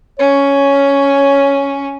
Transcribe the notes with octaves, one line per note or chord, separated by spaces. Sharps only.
C#4 C#5